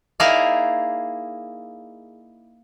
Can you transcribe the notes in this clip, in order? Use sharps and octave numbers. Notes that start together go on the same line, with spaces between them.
A#3 D#4 E4 G#4 D5 F5